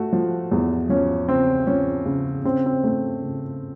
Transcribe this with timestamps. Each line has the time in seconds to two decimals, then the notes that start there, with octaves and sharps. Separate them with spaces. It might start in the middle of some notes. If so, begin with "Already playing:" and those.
Already playing: A3 F#4
0.13 F3
0.52 E2
0.89 F3 C#4
1.28 C#3 C4
1.67 F3 C#4
2.06 C#3
2.44 C#3 C4
2.66 C4
2.84 A3
3.22 C#3